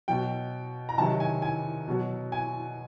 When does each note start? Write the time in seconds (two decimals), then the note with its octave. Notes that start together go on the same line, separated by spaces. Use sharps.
0.08 B2 F#3 G5
0.89 A#5
0.98 C3 D#3 F#3 A5
1.20 G#5
1.42 G#5
1.88 B2 F#3
2.32 G#5